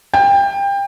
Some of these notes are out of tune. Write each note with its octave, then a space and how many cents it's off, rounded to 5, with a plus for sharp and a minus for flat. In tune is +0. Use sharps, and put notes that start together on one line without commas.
G5 +25